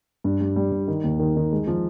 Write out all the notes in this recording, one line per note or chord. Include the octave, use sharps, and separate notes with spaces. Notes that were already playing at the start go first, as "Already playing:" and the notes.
G2
G3
G3
G2
D#3
D#2
D#3
D#3
G#3
F3